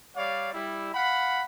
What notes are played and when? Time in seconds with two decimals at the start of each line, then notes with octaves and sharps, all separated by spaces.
0.15 G3 C#5 D5 F5
0.54 G3 E4
0.94 F5 F#5 B5